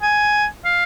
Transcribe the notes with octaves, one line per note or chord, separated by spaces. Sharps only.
G#5
F5